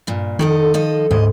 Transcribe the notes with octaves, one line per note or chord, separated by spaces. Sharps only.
G2 A#2
F2 D#3 A4 D#5
F3 A4 D#5
D2 G#2 G#3 D#5